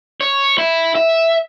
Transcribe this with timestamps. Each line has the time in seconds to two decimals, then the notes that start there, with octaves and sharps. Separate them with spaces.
0.21 C#5
0.58 E4
0.95 E5